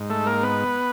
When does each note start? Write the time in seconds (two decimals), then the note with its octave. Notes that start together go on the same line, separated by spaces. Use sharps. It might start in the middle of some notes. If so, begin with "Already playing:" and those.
Already playing: G#2
0.10 A3 A4
0.26 A#3 A#4
0.43 B3 B4